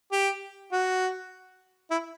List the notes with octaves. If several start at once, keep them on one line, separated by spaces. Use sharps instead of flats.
G4
F#4
E4